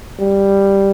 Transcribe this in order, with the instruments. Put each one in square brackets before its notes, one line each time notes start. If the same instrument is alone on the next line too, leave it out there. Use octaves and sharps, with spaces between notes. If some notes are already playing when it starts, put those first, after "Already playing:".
[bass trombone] G3